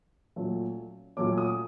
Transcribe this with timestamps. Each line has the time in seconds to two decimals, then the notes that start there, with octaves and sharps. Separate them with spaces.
0.36 A#2 F#3 A3 C#4
1.17 A#2 F#3 A3 C#4 D6
1.38 D#6